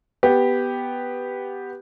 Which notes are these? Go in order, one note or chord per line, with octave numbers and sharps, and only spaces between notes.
B3 G4